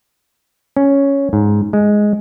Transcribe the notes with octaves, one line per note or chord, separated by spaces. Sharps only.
C#4
G#2
G#3